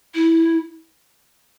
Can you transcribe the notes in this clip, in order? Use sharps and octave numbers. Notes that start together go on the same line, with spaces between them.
E4